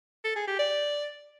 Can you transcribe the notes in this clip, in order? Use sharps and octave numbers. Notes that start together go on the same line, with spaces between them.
A4
G#4
G4
D5